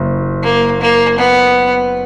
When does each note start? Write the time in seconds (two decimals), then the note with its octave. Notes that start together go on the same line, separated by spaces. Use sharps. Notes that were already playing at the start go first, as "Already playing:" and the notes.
Already playing: F#1
0.43 A#3
0.81 A#3
1.18 B3